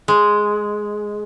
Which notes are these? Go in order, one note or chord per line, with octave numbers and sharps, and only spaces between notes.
G#3